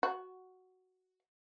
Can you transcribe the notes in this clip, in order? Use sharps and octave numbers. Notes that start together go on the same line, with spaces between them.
F#4